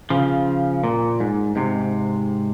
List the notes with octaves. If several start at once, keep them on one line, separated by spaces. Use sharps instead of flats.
C#3 F3
A#2
G#2
G#2 C3